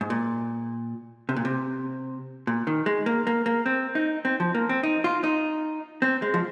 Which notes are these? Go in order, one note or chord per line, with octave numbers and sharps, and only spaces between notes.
G#2
A#2
C3
A#2
C3
A#2
D#3
G#3
A#3
A#3
A#3
C4
D#4
C4
F3
A#3
C4
D#4
F4
D#4
C4
G#3
F3